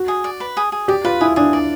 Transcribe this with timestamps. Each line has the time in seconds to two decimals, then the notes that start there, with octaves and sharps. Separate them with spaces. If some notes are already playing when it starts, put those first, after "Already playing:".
Already playing: F#4
0.08 G#4
0.24 D5
0.40 B4
0.57 G#4
0.72 G#4
0.88 G4 D5
1.05 F4 B4
1.21 E4 G#4
1.36 D4 G#4
1.53 D5